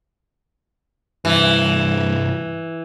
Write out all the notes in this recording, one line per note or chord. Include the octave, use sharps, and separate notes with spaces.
C2 G2 E3